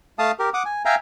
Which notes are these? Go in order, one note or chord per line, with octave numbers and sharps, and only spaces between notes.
A3 F5 A5 D#6
G4 A#4
F#5 D6 D#6
G#5
E5 F5 G5 G#5 A#5